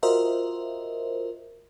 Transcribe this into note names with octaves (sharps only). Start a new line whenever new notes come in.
F4 F#4 A#4 C5 D#5 E5